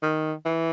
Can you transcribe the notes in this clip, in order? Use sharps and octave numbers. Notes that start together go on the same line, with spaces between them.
D#3
E3